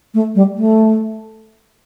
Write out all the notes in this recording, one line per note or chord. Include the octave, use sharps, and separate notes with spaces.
A3
G3
A3